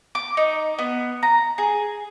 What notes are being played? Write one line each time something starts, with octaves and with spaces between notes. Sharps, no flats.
D6
D#4
B3
A#5
G#4